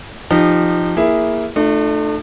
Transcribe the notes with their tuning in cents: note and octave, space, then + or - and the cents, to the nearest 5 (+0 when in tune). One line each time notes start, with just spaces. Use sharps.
F3 -5 D#4 -25 G4 +0
A#3 +5 E4 +0 G#4 -10
A3 +0 D4 +45 F4 +0